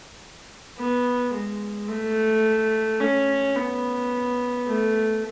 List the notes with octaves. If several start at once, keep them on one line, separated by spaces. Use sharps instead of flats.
B3
G#3
A3
C#4
B3
A3